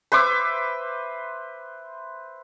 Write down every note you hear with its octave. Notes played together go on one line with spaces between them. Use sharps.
B4 C5 E5 D6